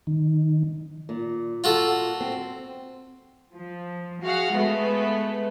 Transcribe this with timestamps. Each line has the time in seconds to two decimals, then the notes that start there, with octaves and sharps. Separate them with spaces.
0.07 D#3
1.09 A#2
1.64 F4 F#4 A4
2.20 C4
3.53 F3
4.22 F#4 G#4 F5 F#5
4.52 G#3 A3 B3 B4